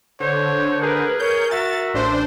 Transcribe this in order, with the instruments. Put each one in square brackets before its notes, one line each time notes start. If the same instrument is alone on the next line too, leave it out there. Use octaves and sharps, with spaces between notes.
[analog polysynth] D3 [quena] C5 [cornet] C#5
[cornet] G#4 [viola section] A#4 B4
[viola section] A#4 [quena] C#5 [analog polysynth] G6
[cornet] F#4 [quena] E5 [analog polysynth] A6
[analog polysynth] A1 D4 C5 [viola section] C6